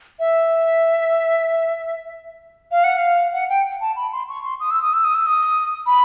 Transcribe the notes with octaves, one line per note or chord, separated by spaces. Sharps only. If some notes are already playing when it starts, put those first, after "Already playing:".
E5
F5
F#5
F5
F#5
G5
A5
B5
C6
C#6
C6
D#6
E6
D#6
E6
D#6
E6
D#6
B5